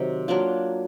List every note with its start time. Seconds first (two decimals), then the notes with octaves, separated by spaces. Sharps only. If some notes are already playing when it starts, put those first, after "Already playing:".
Already playing: C3 D#3 F#3
0.28 F#3 A#3 D4 F4